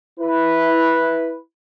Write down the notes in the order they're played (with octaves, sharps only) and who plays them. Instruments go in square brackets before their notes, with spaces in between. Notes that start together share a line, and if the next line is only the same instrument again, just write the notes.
[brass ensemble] E4 B4